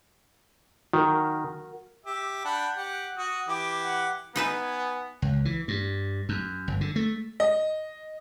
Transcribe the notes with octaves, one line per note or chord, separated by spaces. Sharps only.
D#3 F#4 A#4
G4 E5
D4 F#5 B5 G6
G4 F#5
F#4 D#6
E3 G4 D6
F#5
B3 D#4 B4 E5 G#5
C#2
E3
G2
F#2
G1
D3
A3
D#5